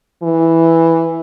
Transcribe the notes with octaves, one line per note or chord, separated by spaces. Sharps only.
E3